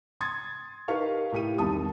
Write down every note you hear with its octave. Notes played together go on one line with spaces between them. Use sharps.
C6 D#6 G#6 A6
D#4 G4 A#4 B4 F5 C#6
A2 G4 D#7
E1 C2 D#3 A5 D#6